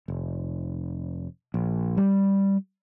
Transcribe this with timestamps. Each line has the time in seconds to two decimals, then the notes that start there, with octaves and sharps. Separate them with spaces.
0.08 F1
1.54 A#1
1.97 G3